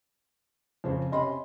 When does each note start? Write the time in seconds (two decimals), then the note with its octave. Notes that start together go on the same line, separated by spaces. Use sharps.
0.84 F2 C#3 C5
1.12 C3 C#4 D#5 B5 C6